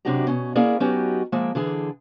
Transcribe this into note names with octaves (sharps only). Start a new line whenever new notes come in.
F#2 C3 D4 F#4 G4 A#5
B2 C#4
A#3 C#4 E4 G#4 A#4 D5
F#3 B3 C#4 D#4 F#4 G4
F3 G#3 A#3 E5
D3 E3 G#4 A4